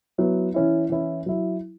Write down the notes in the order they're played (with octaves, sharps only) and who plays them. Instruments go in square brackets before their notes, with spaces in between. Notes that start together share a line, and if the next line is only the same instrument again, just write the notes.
[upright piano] F#3 B3 E4
E3 C#4 E4
E3 C#4 E4
F#3 E4